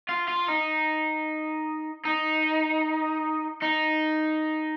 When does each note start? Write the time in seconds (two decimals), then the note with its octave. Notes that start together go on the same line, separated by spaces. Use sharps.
0.09 F4
0.28 F4
0.48 D#4
2.05 D#4
3.62 D#4